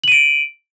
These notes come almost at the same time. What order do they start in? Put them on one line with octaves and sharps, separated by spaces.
F#7 D#7 D7